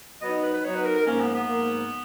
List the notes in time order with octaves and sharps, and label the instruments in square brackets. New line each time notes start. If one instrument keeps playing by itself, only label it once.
[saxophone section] F#3 B3 D#4 [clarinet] D#5
[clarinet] B4
B4
[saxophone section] F#3 B3 D#4 [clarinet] C#5
[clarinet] B4
A#4
A#4
[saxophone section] G#2 F3 A#3 [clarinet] C#4
[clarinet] B3
B3
[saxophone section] G#2 F3 A#3